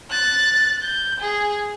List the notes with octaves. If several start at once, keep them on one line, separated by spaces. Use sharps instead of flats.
F#6 A6
G6
G#4